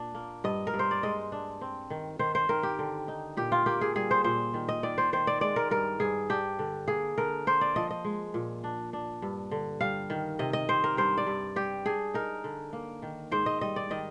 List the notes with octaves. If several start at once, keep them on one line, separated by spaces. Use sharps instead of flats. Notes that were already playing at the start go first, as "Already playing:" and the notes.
Already playing: A#2 D4
A#3
G2 D#5
A#4
G2
C5
D5
G#3 D#5
D4
C4
D#3
D#3 C5
C5
D#3 A#4
G4
D3
D#4
A#2 G4
F4
A#3 G4
G#4
G3 G#4
C5
A#2 C5
D#3
D#5
D#3 D5
C5
D#3 C5
D5
G#3 D5
A#4
G2 A#4
G2 G#4
D4 G4
D3
A#3 G#4
D3 A#4
A#3 C5
D5
F3 D#5
D#5
G#3
A#2
D4
D4
G2
D3
G3 F5
D#3
C3 D#5
D#5
C3 C5
A#4
G2 C5
D5
G2
G3 G4
D4 G#4
D#4 A#4
D3
A#3
D#3
G#2 C5
D#5
G3 D#5
D5
D#3 D#5